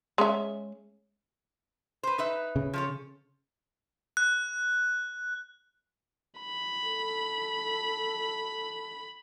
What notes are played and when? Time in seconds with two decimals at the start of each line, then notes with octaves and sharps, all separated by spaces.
0.18 G#3 C#4 E5
2.03 B4 C5
2.18 D#4 B4 E5
2.56 C#3
2.74 F3 A4 C#5
4.17 F#6
6.41 B5
6.86 A4